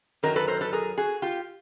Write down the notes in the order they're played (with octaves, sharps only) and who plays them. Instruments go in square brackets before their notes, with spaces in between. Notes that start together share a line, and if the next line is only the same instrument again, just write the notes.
[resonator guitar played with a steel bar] F#2 D#3 F#3 A#4
A4 B4
A#4 C5
A4 B4
G#4 A#4
F#4 G#4
F4 G4